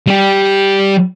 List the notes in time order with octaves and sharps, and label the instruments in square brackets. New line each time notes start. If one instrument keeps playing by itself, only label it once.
[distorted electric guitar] G3 G4